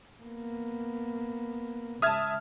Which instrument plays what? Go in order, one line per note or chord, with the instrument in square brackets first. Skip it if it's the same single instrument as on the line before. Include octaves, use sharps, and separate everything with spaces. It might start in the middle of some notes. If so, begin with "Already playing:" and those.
[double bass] A#3 B3
[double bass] C#3 G#3 [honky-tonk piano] E5 A5 [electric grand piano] D#6 F6 G#6